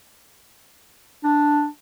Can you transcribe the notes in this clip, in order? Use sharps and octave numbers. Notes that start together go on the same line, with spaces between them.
D4